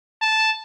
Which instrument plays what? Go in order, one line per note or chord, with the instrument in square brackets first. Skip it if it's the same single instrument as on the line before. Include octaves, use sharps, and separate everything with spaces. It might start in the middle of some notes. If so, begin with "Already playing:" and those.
[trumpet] A5